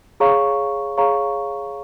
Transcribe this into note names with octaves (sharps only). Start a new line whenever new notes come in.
G#4 C#5 F5 A#5 C#6
G#4 C#5 F5 A#5 C#6